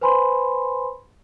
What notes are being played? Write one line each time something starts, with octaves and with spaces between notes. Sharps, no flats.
B4 C5 G#5 B5 C6